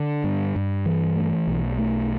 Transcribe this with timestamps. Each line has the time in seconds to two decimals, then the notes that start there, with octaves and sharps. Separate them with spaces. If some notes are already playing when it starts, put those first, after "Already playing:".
Already playing: D3
0.24 G2
0.56 G2
0.86 E3
1.16 A3
1.47 B1
1.78 A3